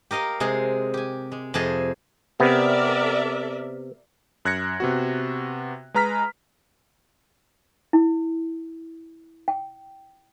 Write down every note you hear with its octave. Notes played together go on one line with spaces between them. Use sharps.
G4 A#4 D#5 F5
C3 G#3 G#4 C6
G4 G#5
G#3
F2 C3 G#4 D#5 A5
C3 B3 A#4 D5 E5
F#2 F#6 G#6 A#6 C#7
C3 B3 F#4
G#3 B4 A#5 F6 B6
E4
G5